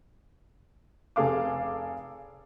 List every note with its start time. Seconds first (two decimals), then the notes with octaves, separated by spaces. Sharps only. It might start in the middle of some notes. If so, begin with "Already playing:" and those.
1.16 F1 G#4 A4 F5 D6